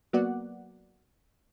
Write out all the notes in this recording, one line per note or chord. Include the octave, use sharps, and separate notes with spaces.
F#3 A#3 B3 F#4 D5 F#5